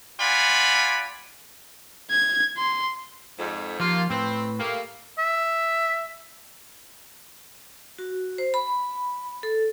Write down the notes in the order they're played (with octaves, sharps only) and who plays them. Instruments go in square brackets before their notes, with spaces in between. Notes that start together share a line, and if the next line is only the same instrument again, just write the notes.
[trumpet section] F4 D5 F#5 G#5 B5
[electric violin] G#6
C6
[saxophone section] F2 G#2
[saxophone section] D#2 A#3 F4 [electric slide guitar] F3
[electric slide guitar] A2 B4 [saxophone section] C4
[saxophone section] G3 A3 A#3
[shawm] E5
[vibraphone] F#4
C5
B5
A4